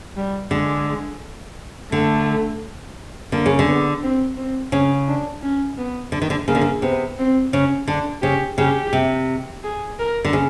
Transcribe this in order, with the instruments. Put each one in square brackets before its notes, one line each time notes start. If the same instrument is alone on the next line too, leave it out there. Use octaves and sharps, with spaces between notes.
[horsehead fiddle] G3
[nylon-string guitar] D3 [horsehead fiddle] G#3
[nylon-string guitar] D3 [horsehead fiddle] A3
[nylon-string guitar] D3 [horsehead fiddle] A#3
[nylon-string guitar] C#3
D3
[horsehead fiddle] B3
C4
C4
[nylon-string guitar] C#3 [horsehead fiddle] C#4
[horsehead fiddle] D4
C#4
B3
[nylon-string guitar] D3
D#3
D3
[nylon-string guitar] C#3 [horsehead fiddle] A#3
[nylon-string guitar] D3
C#3
[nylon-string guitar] C3 [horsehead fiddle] B3
[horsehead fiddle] C4
[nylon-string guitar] C#3 [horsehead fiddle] C#4
[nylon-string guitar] D3 [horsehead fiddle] D4
[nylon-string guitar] C#3 [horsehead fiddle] G4
[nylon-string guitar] C#3 [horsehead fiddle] G4
[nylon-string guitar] C3
[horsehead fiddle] G#4
A#4
[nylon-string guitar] D3
C#3